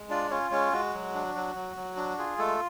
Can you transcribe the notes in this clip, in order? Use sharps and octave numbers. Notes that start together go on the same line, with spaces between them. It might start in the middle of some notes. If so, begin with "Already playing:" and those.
Already playing: G#3
D4 F4 D5
C#4 F4 C#5
G#3 C#4 C#5
G#3 F#4
F#3
D4
F#3
F#3
F#3
D4
F4 G#4
G#3 A3 A4